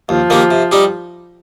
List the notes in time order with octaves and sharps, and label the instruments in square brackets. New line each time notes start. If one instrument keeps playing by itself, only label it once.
[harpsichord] D#2 [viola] F3
[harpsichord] D#3 A#3 G4
C3
G3 D#4 G4